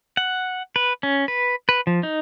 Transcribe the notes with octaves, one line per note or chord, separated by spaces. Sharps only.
F#5
B4
C#4
B4
B4
F3
D#4